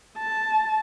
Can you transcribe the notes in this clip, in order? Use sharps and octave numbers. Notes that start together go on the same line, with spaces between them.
A5